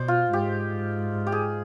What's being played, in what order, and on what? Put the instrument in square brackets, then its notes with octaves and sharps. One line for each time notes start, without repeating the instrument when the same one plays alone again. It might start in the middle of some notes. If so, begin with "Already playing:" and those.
Already playing: [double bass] B2 [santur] C5 D5
[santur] F4
[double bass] G#2 [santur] G4
[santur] G4
G#4